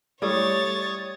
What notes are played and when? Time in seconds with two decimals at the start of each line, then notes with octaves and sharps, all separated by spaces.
0.22 G3 A3 E4 C#5 C#6 D#6 G#6 A6